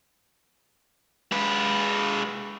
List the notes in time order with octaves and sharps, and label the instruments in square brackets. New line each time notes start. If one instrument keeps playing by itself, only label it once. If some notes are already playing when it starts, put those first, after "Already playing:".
[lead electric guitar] G#3 B4